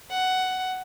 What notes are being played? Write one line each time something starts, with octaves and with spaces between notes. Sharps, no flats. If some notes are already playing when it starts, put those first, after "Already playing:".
F#5